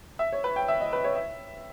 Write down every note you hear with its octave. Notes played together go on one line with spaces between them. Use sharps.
E5
C#5
B4
G5
E5
D#5
B4
C#5
E5